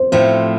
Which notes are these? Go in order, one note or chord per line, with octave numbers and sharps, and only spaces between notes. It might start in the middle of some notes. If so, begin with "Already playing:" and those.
Already playing: C5
A2 F3 A3 C4 C5